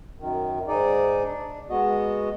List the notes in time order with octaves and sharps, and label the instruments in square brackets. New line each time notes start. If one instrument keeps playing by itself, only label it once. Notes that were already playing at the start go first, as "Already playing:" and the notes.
[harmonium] F#2 D#3
G#2 D#4 G#4 D5
D4
G#3 B3 F#4 D#5